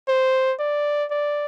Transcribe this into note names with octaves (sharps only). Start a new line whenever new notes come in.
C5
D5
D5